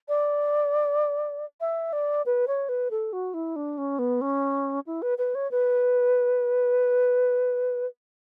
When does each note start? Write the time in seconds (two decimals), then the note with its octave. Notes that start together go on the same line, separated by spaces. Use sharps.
0.09 D5
1.61 E5
1.93 D5
2.26 B4
2.47 C#5
2.69 B4
2.91 A4
3.13 F#4
3.34 E4
3.56 D4
3.78 C#4
3.99 B3
4.21 C#4
4.86 E4
5.02 B4
5.18 B4
5.35 C#5
5.51 B4